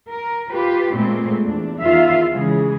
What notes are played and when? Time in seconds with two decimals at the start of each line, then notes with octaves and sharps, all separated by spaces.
0.11 A#4
0.51 F4 G4 B4
0.95 A#2 G#3 A3 B3 C4
1.44 E2 D4
1.80 E2 D#3 F4 E5 F5
2.33 C#3 E3 G#3 G#4